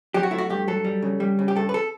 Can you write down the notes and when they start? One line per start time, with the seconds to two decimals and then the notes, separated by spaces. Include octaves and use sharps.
0.14 F#3 G4
0.23 F#4
0.31 A3 E4
0.38 F#4
0.50 G2 G4
0.68 F#3 A4
0.85 G3
1.02 C#3
1.20 G3
1.39 C#3
1.48 G4
1.56 G2 A4
1.69 B4
1.74 A4